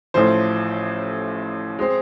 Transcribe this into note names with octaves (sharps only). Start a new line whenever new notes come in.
A1 A2 F3 C5
G#3 C4